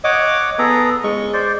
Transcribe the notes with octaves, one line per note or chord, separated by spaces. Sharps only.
C#5 D#5 F#5 D6
B3 G#4 A4 A#5
G#3 C#6
C5 D5